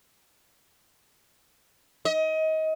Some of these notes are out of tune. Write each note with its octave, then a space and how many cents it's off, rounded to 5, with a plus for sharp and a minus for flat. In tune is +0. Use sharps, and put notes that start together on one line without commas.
D#5 +25